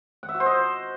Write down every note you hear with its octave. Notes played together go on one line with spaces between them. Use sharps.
F#5
E5
F#4
C5
D#5